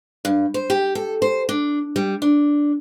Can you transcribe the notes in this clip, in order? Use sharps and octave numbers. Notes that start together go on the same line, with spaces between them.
G2
C5
G4
A4
C5
D4
G3
D4